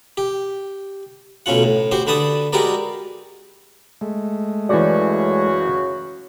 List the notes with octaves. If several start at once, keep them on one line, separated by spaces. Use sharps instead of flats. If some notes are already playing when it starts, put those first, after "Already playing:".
G4
B1 A3 C#4 F4 F#5
A2
F#4 G4 C5 C6
D3 D4 B4 A5 D#6
G#3 F#4 G4 A#4 B4 D5
G#3 A3
F#2 C#3 E3 F#4 D5